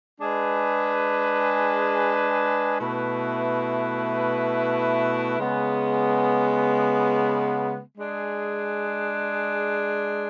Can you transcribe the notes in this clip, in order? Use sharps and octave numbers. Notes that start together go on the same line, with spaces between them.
G#3 D4 G#4 B4
B2 A3 E4 B4
C#3 G#3 B3
G#3 D4 G#4